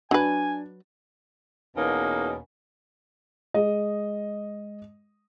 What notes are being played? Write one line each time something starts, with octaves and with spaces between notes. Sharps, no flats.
F#3 D4 B4 G#5
E2 B2 A#3 C#4 D#4
G#3 D#5